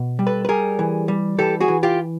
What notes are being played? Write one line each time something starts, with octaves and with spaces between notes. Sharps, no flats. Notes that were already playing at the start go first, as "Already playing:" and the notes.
Already playing: B2
G3
A4 B4
B4
G3 G#4 A#4
E3
G3
E3 G4 A4
F#4 G#4
E3
F4 G4